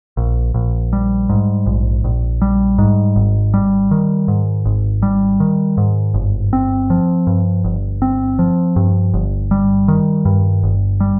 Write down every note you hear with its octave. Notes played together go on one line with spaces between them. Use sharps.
A#1
A#1
G3
G#2
A#1
A#1
G3
G#2
G#1
G3
D#3
G#2
G#1
G3
D#3
G#2
G1
C4
F3
G2
G1
C4
F3
G2
G1
G3
D#3
G2
G1
G3